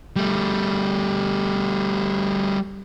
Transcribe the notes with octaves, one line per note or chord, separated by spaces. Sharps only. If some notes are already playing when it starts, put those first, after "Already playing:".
G3 A3